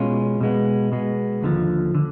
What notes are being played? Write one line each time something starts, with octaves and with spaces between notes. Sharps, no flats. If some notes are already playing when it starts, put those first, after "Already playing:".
Already playing: B2 G#3 C#4 F4
B2 G#3 B3
B2 G#3 B3
D#2 D3 F3
D3